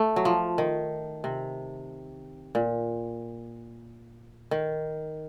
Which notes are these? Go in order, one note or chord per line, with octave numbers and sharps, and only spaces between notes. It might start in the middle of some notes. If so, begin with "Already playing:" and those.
Already playing: A3
F#3
F3
D#3
C3
A#2
D#3